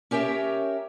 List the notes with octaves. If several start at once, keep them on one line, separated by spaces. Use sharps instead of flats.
C#4 G4 A#4 C#5 E5